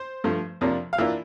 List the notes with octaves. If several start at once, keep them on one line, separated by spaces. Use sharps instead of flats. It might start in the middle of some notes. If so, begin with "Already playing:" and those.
Already playing: C5
G2 F3 A3
F2 C3 F3 A#3 D4
F5
E3 A#3 D4 F4 E5